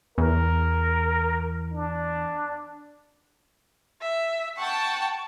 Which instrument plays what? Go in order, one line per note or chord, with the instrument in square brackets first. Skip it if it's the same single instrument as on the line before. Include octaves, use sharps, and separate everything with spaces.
[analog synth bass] E2 [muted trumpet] A#4
[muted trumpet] D4
[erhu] E5
[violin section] F#5 G5 A5 [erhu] C#6